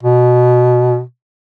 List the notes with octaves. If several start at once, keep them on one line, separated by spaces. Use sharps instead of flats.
B2